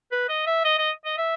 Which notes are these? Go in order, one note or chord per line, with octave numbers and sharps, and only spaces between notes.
B4
D#5
E5
D#5
D#5
D#5
E5